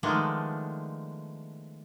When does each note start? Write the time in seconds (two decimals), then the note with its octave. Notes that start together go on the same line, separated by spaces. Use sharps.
0.03 D#3 F3 G#3 A3 B3 D4